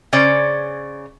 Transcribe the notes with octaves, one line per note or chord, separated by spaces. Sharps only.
C#3 C#4 C5 D5